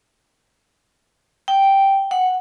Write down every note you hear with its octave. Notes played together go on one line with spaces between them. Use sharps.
G5
F#5